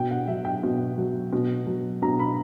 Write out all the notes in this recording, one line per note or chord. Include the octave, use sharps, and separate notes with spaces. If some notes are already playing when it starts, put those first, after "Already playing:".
Already playing: B2 G5
F#5
F#3 E5
G5
B2
F#3
B2
F#3
B2 A#5
B5